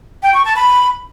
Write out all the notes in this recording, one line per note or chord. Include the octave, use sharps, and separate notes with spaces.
G5
C#6
A5
B5